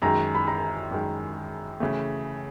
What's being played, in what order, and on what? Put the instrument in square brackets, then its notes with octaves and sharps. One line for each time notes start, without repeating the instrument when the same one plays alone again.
[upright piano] F#2 D#3 G#3 [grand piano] A#5
[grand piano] B5
A#5
[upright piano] F#2 D#3 G#3
C#3 E3 A3